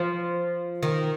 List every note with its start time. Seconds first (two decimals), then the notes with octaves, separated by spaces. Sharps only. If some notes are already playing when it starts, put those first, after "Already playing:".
Already playing: F3
0.83 D#3